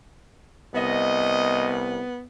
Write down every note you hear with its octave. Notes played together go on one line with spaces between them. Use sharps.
C2 B3 D#5